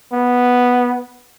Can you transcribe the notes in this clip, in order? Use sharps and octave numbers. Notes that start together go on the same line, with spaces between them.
B3